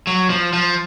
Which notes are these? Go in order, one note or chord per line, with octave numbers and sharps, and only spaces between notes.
F#3
F3
F3